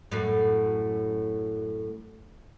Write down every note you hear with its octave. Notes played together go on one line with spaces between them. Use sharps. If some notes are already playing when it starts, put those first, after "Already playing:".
F#2 A2